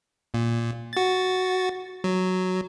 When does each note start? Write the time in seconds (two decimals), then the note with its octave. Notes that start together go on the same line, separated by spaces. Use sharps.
0.34 A#2
0.93 F#4 A6
2.04 F#3